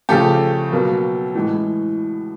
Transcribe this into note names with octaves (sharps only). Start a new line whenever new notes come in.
C#3 F3 A3 G4 A4
B2 F#3 A#3
A2 E3 G#3